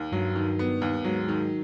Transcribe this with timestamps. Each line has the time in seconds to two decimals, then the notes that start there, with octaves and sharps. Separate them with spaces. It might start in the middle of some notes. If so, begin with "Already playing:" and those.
Already playing: D#2
0.12 G2 F#3
0.35 D#3
0.59 B3
0.82 D#2
1.05 G#2 F#3
1.28 D#3